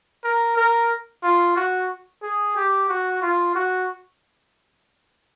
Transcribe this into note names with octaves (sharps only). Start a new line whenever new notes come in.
A#4
A#4
F4
F#4
G#4
G4
F#4
F4
F#4